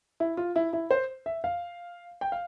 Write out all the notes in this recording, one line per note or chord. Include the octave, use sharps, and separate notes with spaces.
E4
F4
E4
E4
C5
E5
F5
G5
F5